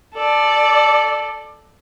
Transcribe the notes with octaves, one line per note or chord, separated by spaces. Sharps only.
A4 D5